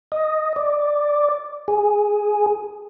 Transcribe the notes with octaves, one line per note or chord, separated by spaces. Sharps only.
D#5
D5
G#4